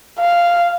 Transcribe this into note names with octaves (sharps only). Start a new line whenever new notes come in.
F5